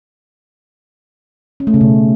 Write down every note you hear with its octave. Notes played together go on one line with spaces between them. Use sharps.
C#4
A3
C#3
B2